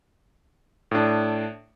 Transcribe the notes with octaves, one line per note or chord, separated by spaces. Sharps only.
A2 D4